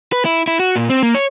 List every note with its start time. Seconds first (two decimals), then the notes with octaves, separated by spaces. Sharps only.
0.12 B4
0.25 E4
0.48 E4
0.60 F#4
0.76 A#2
0.89 C4
1.03 A#3
1.15 C#5